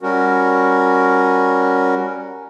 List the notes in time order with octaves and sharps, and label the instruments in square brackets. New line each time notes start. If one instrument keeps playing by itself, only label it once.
[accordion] G3 C#4 F#4 A#4